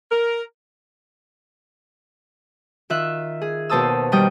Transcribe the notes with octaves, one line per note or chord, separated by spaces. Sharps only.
A#4
D#3 F4 E5 F#6
G#4
D#2 B2 C5 A5 D#6 E6
D#2 D#3 G3 G5 D#6